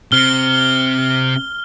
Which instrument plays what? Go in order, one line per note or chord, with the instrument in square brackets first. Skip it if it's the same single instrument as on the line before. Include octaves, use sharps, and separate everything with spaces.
[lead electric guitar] C3 C4 [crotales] F6 G7